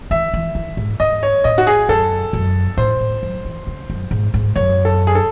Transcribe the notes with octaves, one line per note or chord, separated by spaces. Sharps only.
E3 E5
E3
E3
G#2
G#2 D#5
C#5
A2 D#5
F#4
G#4
F#2 A4
F#2
A2 C5
A2
F#3
E3
C#3
F#2
G#2
G#2
F#2 C#5
A4
G#4
A4